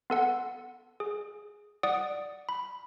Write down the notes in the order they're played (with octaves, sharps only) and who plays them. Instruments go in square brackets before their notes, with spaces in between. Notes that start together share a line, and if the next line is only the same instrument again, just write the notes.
[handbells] B3 A4 F#5
G#4
D5 F#5 D#6 D7
B5